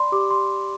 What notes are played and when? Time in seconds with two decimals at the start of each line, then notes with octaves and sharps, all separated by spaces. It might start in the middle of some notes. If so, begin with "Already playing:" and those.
Already playing: D5 B5 C6
0.12 G4 D6
0.31 C6